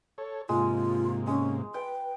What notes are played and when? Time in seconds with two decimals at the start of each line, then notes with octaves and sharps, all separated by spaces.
0.18 A4 C#5
0.49 G#2 C3 G#3 A#3 F4
1.27 G#3 C#4
1.74 B4 G5